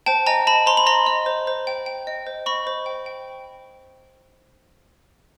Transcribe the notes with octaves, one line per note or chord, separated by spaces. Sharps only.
C5 G5 A5
D#5 G#5 A#5
D#5 A5 B5
C5 A#5 C6
B5
D#5 A#5 C6
D#5
C5
C5
G5
G5
D#5
C5
D#5 B5 C#6
C5
G5
G5